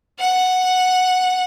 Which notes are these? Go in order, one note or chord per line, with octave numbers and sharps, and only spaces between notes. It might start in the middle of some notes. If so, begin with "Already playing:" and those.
F#5